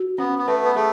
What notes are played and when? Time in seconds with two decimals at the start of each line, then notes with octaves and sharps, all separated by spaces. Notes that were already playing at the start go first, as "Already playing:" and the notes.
Already playing: F#4
0.18 B3 C#4
0.38 B3
0.47 A3 B4
0.64 B3
0.75 A3 G#4